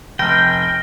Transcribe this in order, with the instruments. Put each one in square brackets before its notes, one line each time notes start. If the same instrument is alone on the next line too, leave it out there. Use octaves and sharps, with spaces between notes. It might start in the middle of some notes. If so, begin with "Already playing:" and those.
[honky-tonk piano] F1 [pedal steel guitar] G5 [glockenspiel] F6 A#6